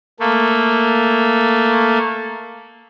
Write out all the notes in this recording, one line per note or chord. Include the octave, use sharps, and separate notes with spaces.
A3 A#3